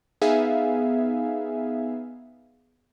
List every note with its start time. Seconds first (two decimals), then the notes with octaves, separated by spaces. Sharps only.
0.22 B3 D#4 G#4 E5 F5 G#5